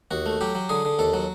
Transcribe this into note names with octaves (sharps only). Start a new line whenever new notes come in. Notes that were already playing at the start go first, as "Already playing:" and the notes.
D#2 F#4
A3
F#3 G4
F#3
D3 G#4
D3
D#2 A4
F#3